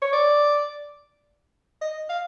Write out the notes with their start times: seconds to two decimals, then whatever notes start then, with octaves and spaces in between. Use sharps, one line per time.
0.02 C#5
0.13 D5
1.81 D#5
2.09 F5